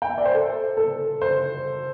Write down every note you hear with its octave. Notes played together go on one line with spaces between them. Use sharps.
G5
E5
D5
C5
A4
A4
C5